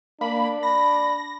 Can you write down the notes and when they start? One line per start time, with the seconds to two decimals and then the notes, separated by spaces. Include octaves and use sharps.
0.21 A#3 D4 B5
0.63 B5 A#6